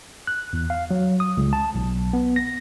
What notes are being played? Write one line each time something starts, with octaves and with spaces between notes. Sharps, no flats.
F#6
E2
F5
F#3
D#6
C#2
A5
B1
B3
A#6